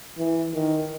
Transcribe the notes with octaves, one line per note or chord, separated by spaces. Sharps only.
E3
D#3